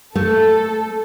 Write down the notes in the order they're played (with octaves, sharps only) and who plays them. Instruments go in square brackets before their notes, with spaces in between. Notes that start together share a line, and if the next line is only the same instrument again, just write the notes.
[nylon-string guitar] A3 [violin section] A4